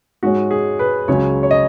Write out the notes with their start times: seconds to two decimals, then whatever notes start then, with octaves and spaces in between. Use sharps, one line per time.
0.23 G#2 G#3 C#4 F#4
0.51 G#4
0.79 B4
1.08 C#2 C#3 F#3 C#4 C#5
1.43 C#5
1.51 D#5